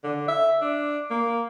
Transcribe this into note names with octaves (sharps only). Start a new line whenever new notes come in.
D3
E5
D4
A#3